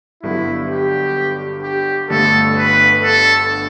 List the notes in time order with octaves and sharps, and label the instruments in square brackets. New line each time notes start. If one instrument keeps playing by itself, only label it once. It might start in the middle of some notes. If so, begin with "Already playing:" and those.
[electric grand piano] G1 G2 D3 F#3 B3 [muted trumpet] E4
[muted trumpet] G4
G4
[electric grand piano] G1 G2 D3 A3 [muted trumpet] A4
[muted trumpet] B4
A4